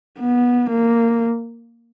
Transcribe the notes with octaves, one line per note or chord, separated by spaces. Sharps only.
B3
A#3